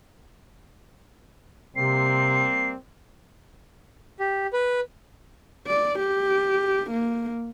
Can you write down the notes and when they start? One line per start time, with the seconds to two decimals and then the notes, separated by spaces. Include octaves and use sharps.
1.76 C3 G3 A#3 C4 C7
4.19 G4
4.53 B4
5.67 D5
5.99 G4
6.91 A#3